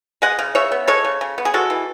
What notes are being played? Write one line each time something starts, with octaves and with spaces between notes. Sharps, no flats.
G#3 D#5 F#5
C#3
C#3 C#5 E5
B3
G#3 A4 C#5
C#3
C#3
B3
G#4
G#3 F#4 A4
E3